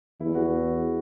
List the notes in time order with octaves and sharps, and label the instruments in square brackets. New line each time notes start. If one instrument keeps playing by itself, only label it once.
[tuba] E2 [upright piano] E4
[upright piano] F#4